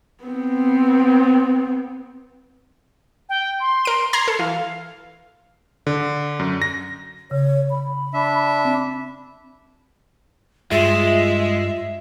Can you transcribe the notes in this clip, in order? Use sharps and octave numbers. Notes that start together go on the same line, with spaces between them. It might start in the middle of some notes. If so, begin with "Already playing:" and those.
B3 C4
G5
C6
A#4 D7
A#5 C6 G#6 C7
A4
E3 F5
D3
F#2
A#6
C#3 C#5
B5
D4 E5
C4
G2 G#3 F4 E5